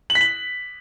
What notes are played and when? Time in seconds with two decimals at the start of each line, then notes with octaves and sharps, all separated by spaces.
0.10 F#7
0.15 B6
0.21 F#7